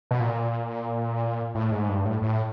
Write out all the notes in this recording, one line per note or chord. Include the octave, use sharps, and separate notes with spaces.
B2
A#2
A2
G#2
G2
A2
A2